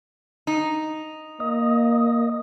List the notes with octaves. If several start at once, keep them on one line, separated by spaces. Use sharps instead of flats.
D#4
A#3 D#5